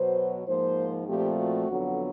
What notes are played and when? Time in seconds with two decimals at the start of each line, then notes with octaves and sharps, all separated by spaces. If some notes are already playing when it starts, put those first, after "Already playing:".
Already playing: B2 F#3 B3 C5
0.46 G#2 F3 A#3 C5
1.07 A#2 F3 A3 C4 G4
1.37 F#4
1.67 F2 D3 F#3 B3